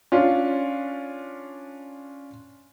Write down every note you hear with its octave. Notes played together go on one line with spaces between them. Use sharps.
C#4 D4 F4